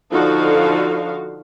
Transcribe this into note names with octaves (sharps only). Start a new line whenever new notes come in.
D3 F3 D#4 F#4 A4 F5